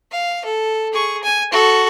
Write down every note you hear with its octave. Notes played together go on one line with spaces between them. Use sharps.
F5
A4
G#4 C#6
G#5
F#4 A4